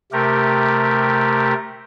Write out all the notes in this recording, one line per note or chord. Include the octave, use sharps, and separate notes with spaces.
C3 A3 G4 A#4